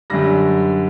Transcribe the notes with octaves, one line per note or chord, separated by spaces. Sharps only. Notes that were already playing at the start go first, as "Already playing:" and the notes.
F#2 D3 G3 A#6